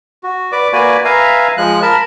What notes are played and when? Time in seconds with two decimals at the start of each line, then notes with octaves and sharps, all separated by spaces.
0.23 F#4
0.52 B4 D5 D6
0.73 A#3 F#4 B4 D5 G#5
1.04 B4 E5 F5 G#5 A#5
1.58 F3 G#3 F#6
1.82 A#4 A5 B5